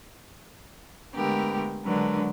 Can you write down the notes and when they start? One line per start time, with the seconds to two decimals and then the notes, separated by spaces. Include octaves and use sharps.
1.14 D3 G#3 A3 B3 G4 A#4
1.84 D3 F#3 G#3 D4 A#4 B4